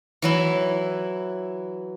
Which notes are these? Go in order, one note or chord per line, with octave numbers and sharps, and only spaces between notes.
E3 F#3 E4